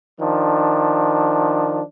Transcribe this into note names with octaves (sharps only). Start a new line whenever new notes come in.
D#3 F3 D4